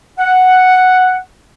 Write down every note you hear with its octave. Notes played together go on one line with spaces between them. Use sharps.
F#5